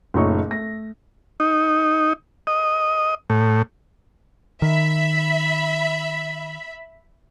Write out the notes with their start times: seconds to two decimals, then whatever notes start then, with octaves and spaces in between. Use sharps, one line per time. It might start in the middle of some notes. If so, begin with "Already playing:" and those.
0.14 F#1 A#2 A3 D#4 C#5 C#6
0.51 A3 A#6
1.40 D#4
2.47 D#5
3.30 A2
4.62 D#3 E5 B5